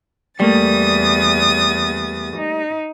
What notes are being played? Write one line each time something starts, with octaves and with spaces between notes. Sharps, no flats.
E2 G3 A3 A#3 D#6 A6
D#4